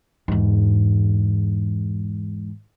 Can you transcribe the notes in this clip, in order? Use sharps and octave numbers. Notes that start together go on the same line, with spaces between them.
E2 G#2